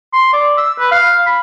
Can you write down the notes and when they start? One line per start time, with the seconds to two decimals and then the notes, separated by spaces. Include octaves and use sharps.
0.13 C6
0.33 D5
0.57 E6
0.79 B4
0.91 F5
1.26 B5